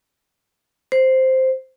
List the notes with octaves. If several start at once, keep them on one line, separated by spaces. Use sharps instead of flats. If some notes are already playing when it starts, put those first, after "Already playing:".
C5